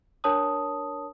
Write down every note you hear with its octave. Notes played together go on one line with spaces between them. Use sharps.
D4 A#4 C#5 A5 D#6